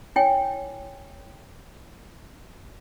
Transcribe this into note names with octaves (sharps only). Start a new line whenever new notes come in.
E4 C#5 G5 G#5